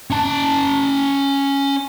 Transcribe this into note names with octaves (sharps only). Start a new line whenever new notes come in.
C#4 A5